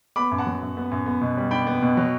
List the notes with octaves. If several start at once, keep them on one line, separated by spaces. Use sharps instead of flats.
B3 B5 D6
F#2
F#5 A5
F#3
F#2
B3
F#2
B3
B2
G3
D4 G5 B5
B3
B2
F#3